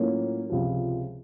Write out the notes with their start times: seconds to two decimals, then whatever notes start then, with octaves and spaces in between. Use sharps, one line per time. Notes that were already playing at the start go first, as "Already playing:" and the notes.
Already playing: A2 F#3 A#3 C#4 F4
0.50 C#2 C3 F3